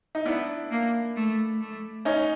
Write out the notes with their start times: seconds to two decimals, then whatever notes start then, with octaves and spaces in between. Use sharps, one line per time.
0.15 D#4
0.25 B3 D4 E4
0.71 A#3
1.16 A3
1.61 A3
2.05 C#4 D#4